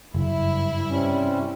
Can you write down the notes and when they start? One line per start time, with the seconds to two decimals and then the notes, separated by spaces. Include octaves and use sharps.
0.15 F#1 G2 E4
0.89 C3 G3 C#4